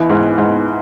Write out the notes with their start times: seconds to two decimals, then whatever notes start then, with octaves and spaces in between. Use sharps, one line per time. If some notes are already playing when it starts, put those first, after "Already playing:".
Already playing: C#2 E3
0.10 G#2
0.38 G#2